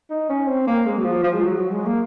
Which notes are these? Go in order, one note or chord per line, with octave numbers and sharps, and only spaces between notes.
D#4
C#4
C4
A#3
G#3
F#3
F3
F3
G#3
F#3
F#3
G#3
A#3